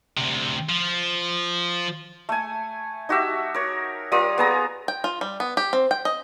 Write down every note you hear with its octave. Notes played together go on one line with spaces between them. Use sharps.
D2 C3
F3
A3 G#5
D#4 F#4 G4 E5
A#4 C#5
G3 F4 A#4 D#6
B3 G#4 A#5
G5
F4
G3
B3
G4
C4
G5
D#5